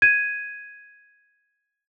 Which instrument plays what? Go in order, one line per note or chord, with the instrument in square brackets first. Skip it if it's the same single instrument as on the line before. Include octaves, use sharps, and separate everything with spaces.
[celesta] G#6 D#7